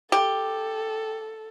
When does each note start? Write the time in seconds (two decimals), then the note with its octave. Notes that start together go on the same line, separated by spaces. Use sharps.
0.12 G4 A4